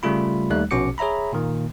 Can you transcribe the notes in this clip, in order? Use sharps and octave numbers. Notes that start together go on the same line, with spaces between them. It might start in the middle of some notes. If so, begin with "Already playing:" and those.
C#3 G3 A3 F4 B5
D#2 G3 A3 D#4 F#6
A#1 B2 C#4 F#4 D6 C#7
G#4 C#5 E5 A#5 B5
A#2 D#3 A#3